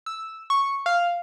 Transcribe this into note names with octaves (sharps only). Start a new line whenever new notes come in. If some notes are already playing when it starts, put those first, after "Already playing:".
E6
C#6
F5